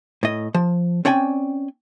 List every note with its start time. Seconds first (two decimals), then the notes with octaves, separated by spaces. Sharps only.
0.23 A2 D#5
0.54 F3
1.05 C4 C#4 D5 G5 G#5